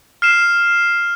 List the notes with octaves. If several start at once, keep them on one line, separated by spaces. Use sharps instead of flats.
F6 C7 E7